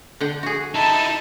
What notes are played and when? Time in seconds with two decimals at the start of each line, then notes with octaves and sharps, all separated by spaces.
0.21 D3 F#5 G5
0.43 F#4 G#4
0.74 D#4 E4 A5